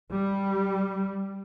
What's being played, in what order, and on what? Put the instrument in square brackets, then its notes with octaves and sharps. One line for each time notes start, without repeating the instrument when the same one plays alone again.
[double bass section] G3